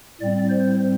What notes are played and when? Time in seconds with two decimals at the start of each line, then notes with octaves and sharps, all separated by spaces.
0.21 A2 G3 C4 D5
0.49 C5